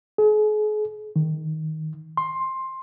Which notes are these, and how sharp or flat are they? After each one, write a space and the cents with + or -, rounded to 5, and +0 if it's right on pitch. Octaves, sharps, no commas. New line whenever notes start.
G#4 +40
D#3 +10
C6 +10